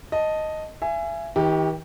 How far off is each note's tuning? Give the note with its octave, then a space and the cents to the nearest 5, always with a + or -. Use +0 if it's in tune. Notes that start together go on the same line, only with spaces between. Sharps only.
D#5 +0 A5 +0
E5 +35 G#5 +0
D#3 +45 G4 +0